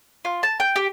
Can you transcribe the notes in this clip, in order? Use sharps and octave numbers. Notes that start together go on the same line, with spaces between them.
F4
A5
G5
G4